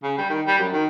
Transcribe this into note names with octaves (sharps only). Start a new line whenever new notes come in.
C#3
G3
D#3
G3
F#2
D#3